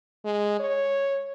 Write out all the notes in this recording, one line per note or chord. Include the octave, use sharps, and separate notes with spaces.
G#3
C#5